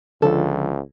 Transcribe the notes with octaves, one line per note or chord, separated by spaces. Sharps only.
C#2 D3 F3 A4